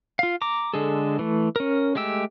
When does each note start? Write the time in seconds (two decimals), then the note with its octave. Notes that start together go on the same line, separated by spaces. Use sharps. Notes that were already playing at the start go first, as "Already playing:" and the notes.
0.19 F4 F5
0.42 A#5 D6
0.74 D3 G#3 G#4 A4
1.19 E3 A3
1.56 C#4 A#4
1.95 G#3 A3 G4 E6